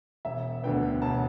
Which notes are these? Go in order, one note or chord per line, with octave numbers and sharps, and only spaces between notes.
E1 E5
D2 D3 B3 G5
E1 A5